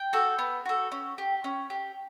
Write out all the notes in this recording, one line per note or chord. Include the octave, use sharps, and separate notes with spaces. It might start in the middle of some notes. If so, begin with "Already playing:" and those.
Already playing: G5
F#4 A4
B3
F#4 A4
C#4
G4
C#4
G4